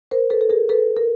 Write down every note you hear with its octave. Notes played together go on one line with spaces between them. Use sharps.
A#4 C5
A4 B4
A4
G#4 A#4
A4 B4
A#4